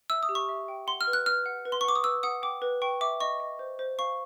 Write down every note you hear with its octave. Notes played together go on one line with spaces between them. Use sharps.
E5 E6
D#6
G4
C#6
E5
G5
F#5 C6
F6
B4
F#6
B4 F6
F#5
B4
C6
C#6
F#5 D6
D#6
B4 E6
F#5 D#6
G5 D6
B4
G5 C#6
E5 D6
D#5 C#6
D#5
C5
C5
F5 C#6